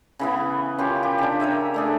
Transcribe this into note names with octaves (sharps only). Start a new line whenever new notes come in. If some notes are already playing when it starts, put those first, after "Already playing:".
C#3 E3 B3
C#4 F4 G4 A#4
G4
C#3 D4
A#4 C#5 E5 G#5
A3 D4 G#4